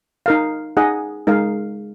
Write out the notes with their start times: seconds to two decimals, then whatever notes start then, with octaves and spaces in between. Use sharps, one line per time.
0.26 D#4 A#4 F5
0.77 D#4 G#4 D#5 F#5
1.27 G#3 D#4 A#4 F5